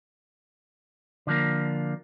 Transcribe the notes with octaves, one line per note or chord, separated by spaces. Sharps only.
D3 F3 A#3